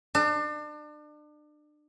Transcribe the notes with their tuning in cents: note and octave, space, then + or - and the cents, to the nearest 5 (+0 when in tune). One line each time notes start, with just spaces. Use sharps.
D4 +35